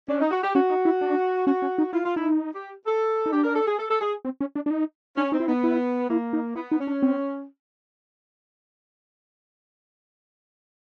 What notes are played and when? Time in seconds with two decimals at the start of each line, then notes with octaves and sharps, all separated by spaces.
0.08 C#4 D4
0.20 D#4
0.31 F#4
0.43 G4
0.55 C#4 F#4
0.70 D#4
0.85 E4
1.01 D4
1.47 C#4 F#4
1.62 C#4
1.78 D#4
1.93 E4 F4
2.05 F4
2.16 D#4 E4
2.55 G4
2.86 A4
3.26 D#4
3.32 D4 G4
3.44 A#4
3.55 A4
3.67 G#4
3.79 A4
3.90 A4
4.01 G#4
4.25 C4
4.41 C#4
4.56 D4
4.66 D4
4.71 D#4
5.17 C#4 D4
5.32 C4 D#4
5.40 E4
5.48 B3 D#4
5.64 E4
6.10 A#3 E4
6.33 D#4
6.55 B3 E4
6.72 D#4
6.80 C#4
6.87 D4
7.03 C4